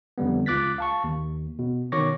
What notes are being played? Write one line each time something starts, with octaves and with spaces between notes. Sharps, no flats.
F2 D3 G3 B3
C#2 F4 D6 F#6 A6 B6
F5 A5 C#6
D#2
B2
B2 D#3 C#5 C#6 D6 A#6